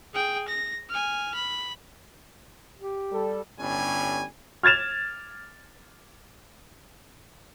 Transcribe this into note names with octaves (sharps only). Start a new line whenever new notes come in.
G#4 G5
A#6
G#5 F6
B5
G4
G3 A4
G1 A2 G3 C#4 G#5
F6 G#6 A6 E7 F7